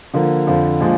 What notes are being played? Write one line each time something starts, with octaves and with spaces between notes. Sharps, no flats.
D3 F3 A#3
F2 D3 F3
A#2 F3 G#3 D4